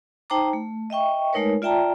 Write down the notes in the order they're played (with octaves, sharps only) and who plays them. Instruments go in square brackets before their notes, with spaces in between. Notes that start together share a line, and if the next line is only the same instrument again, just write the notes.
[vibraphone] D#4 C5 G5 A5 A#5 D6
A3
D#5 E5 G5 C#6
G#3 A3 D#4 A#4 B4 C#5
F4 D5 E5 G5 A5 A#5